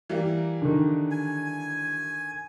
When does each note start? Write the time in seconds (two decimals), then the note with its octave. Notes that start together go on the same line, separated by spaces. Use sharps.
0.10 E3 G3 A#3
0.62 D3 D#3
1.11 G#5